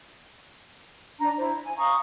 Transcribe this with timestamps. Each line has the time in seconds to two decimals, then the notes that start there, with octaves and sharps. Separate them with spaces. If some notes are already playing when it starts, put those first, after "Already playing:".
1.19 D4 A#5
1.38 E4 C5
1.64 G#5
1.77 F5 A#5 C#6 D#6